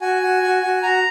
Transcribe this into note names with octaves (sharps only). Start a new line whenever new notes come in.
F#4 G#5
F#4
F#4
F#4
F#4 A#5